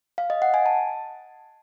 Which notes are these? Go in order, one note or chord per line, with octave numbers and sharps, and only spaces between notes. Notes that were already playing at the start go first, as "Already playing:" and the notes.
F5
D#5
F#5
G#5
A5